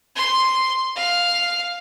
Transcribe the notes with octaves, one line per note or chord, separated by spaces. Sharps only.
C6
F5